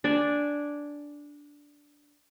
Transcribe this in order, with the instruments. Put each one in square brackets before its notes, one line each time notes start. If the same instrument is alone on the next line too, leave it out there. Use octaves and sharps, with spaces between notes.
[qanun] D4 D5 G#5